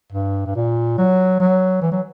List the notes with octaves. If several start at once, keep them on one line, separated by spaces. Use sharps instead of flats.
G2
G2
A#2
F#3
F#3
E3
F#3